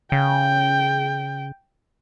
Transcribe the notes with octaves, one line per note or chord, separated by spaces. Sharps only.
C#3 G5